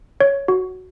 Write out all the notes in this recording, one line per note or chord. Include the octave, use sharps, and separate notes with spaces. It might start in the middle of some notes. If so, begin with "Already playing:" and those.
C#5
F#4